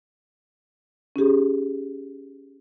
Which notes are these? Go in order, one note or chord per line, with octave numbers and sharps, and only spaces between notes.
C#4 D#4 G4 G#4